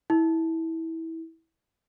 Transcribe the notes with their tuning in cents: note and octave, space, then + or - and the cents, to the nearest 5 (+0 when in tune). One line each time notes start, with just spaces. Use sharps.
E4 -20